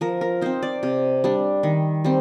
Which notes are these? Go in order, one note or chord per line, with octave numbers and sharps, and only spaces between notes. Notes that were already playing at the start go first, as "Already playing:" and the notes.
F3 A#4
A#4
C4 D#4 C5
D5
C3
G3 D4
D#3
G3 C4